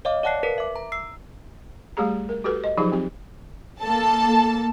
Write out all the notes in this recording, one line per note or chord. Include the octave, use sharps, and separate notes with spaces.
C#5 D#5 F5 D6
D5 F5 F#5 A5 F#6 C7
A#4 B4 B6
E5 D6
A#5
E6 C7
G3 A3 G4 G#4 A#5
A#4
F#4 G4 A4 B4
D#5
F3 F#3 D#4 F4 G4 G#4
C4 G4
A#3 A4 A5